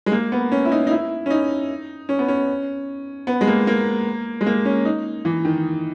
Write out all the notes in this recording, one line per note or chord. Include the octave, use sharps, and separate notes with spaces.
G#3
A#3
B3
C#4
E4
D#4
D#4
E4
C#4
D#4
C#4
B3
C#4
B3
G#3
A#3
A#3
G#3
A#3
C#4
D#4
E3
D#3